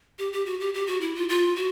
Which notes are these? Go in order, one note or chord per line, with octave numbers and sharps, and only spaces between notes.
G4
G4
F#4
G4
G4
F#4
E4
F4
F4
F#4